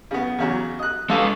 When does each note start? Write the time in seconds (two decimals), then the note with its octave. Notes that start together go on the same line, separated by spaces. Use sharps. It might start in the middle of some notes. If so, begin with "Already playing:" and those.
0.11 C#3 B3
0.38 E2 C#3 F#3
0.79 D#5 F#6
1.10 G#3 A4 B4 F5